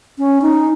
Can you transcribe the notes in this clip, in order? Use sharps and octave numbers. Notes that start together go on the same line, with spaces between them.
C#4
D#4